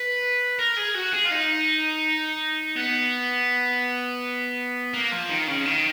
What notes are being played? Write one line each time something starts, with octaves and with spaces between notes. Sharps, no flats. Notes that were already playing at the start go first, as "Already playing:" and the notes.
Already playing: B4
A#4
G#4
F#4
G#4
F4
D#4
B3
A#3
F3
D#3
C#3
D#3